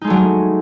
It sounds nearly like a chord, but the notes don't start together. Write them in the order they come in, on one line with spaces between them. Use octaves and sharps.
D#4 G#3 A3 F#3